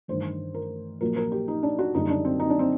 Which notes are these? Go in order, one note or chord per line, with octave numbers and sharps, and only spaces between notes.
A1 G2 D#3 C5
A#4
A#1 A#2 F#3 A#4
A#4
G4
D#4
D4
F#4
F#1 F#2 D3 G3 D#4
D4
C4
D#4
D4
C4